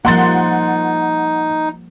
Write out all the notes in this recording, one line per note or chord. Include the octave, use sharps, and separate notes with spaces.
F3 G3 A#3 D#4 F#5 C6 A6